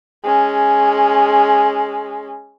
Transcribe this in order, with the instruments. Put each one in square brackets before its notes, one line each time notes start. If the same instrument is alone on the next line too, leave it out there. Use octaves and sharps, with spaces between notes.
[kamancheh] G#3 C#4